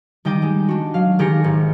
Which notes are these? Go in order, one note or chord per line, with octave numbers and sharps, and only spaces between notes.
D#3 G3 D#5 G5 D6 D#7
G3 G#3
D4 F#4
F#3 F5
D#3 G4 G#4 A#4 A#6 C#7
G#1